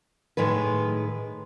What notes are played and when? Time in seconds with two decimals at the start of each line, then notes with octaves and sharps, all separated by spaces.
0.37 A2 D#3 G#3 B4